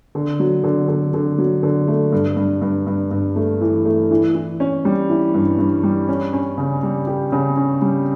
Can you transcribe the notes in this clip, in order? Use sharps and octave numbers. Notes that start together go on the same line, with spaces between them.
D3
F#3
D3
D3
D3
F#3
D3
A3
G2
G2
G2
G2
G2
A3
E3
A3
E3
E3
C#4
G3
E3
G2
G2
G3
C#4
C#4
C#3
G3
G4
C#3
C#4
G3